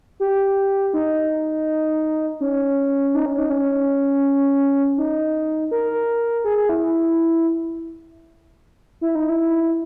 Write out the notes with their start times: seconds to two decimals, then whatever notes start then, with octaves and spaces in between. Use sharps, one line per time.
0.20 G4
0.94 D#4
2.41 C#4
3.14 D#4
3.26 C#4
3.38 D#4
3.50 C#4
4.98 D#4
5.71 A#4
6.44 G#4
6.57 G#4
6.69 E4
9.01 E4
9.15 D#4
9.29 E4